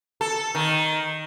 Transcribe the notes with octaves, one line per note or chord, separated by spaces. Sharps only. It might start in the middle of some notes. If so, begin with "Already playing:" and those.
A4
D#3